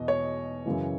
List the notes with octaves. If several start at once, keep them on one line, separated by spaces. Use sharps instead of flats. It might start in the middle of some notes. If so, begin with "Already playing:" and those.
Already playing: E2 B2 D#5
C#5
F#2 C#3 E3